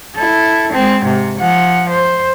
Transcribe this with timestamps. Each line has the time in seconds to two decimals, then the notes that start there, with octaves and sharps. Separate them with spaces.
0.16 E4 A4
0.73 G#3 C4
1.04 G#2 C3
1.39 F3 F#5
1.90 C5